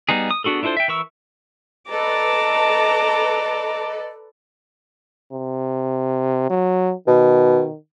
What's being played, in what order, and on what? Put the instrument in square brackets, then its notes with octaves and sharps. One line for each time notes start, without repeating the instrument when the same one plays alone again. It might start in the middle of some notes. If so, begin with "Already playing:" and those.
[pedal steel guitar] G3 B3 D#4 G#4
D#6
B3 D4 F#4 G#4 A4
D4 E4 F4 A4 C5
E5 G5
E3 E4 A#4 C#6 E6
[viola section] A4 B4 D5 [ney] D#5 [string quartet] A5 A#5 D6
[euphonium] C3
F#3
[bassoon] B2 [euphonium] D#3